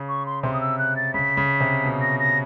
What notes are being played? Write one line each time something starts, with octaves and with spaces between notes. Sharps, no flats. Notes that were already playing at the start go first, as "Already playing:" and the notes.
Already playing: C#3
C#6
C6
C3 C6
D#6
E6
F#6
A6
C#3 B6
C#3
C3
B2
A#6
A#6